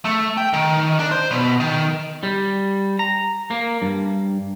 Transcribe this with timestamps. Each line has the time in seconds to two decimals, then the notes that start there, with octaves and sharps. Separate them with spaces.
0.05 A3
0.38 G5
0.53 D#3
0.99 D4
1.11 C5
1.31 B2
1.60 D#3
2.23 G3
2.99 A#5
3.51 A#3
3.82 G2